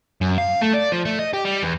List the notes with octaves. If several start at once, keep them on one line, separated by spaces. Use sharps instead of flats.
F#2
F5
A3
D5
F3
A3
D#5
G4
G3
E2